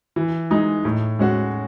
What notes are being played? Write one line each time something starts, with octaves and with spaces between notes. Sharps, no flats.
E3
G#3 D#4
A2
G#3 C#4 F#4